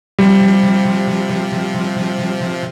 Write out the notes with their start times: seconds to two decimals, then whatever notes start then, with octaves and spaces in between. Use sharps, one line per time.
0.19 C3 F3 G3